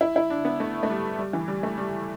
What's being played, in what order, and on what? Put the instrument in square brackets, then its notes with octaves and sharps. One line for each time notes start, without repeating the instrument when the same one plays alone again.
[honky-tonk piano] E4
E4
D4
B3
A3
A3
G3
G3
E3
G3
A3
G3